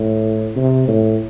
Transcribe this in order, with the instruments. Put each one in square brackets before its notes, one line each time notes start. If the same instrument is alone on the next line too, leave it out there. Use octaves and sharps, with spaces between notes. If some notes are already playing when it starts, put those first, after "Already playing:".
Already playing: [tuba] A2
C3
A2